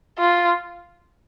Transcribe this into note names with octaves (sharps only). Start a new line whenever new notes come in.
F4